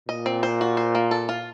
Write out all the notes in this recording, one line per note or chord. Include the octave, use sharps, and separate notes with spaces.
A#2 D#5
C4
C5
F#4
C5
A#3
A4
F4